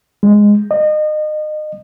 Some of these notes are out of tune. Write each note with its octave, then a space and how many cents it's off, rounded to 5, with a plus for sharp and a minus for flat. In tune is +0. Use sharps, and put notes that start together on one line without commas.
G#3 -5
D#5 -30